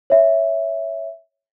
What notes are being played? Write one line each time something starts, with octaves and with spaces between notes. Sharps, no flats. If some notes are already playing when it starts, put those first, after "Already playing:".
C#5 E5